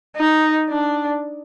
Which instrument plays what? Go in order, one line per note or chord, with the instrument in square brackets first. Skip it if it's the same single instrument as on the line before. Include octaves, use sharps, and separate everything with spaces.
[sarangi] D#4
D4